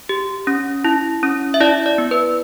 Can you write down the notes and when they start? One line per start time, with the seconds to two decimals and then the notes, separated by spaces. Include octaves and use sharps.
0.09 G4
0.47 C#4
0.85 E4
1.23 C#4
1.54 E5
1.60 E4 D5
1.86 D5
1.98 B3
2.11 B4